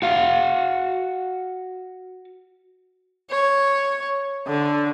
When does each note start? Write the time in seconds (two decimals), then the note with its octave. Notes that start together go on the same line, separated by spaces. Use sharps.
0.02 F#4 F5
3.30 C#5
4.47 D3